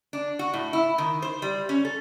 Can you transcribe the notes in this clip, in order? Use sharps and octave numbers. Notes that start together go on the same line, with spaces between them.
D4
F#4
A2
E4
D#3
C5
G3
C#4
A4